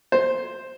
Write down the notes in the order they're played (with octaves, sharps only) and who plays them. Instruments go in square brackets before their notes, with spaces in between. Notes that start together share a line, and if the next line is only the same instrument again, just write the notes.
[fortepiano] C5